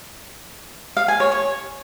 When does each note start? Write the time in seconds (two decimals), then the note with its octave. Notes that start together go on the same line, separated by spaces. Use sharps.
0.97 F5
1.08 G#5
1.20 C#5
1.32 C#5